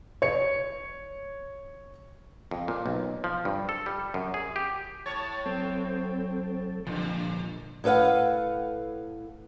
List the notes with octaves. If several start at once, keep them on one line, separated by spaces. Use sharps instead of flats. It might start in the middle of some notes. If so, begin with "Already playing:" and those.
C#5 C#7
F2
A#2
B1
F3
G2
A4
G3
F#2
G#4
G4
A2 C#5 A5 A6
F#3 C4 A4
G2 A#2 D3 F3
A2 A4 B4 F5 F#5